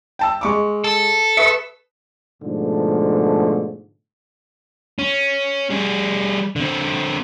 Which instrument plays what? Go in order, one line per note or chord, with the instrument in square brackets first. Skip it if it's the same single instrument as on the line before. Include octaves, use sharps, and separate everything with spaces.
[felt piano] G5 A5 E6
G#3 C#6 D6
[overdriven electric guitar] A4
[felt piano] B4 D#6 [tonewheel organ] E5 C#6
[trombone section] G#2 B2 D3 F3 A3
[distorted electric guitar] C#4
G3 G#4
D3 C4